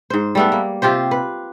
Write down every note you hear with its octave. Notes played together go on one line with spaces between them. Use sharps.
G#2 C5
G3 A3 B3
A#3
C3 F4 G4 C5
B4